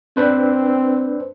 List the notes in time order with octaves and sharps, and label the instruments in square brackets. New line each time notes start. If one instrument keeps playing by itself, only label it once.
[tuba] C4 [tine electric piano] D4 B4 C5